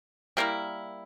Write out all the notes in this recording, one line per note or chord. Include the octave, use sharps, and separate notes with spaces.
G3 A#3 E4 A#4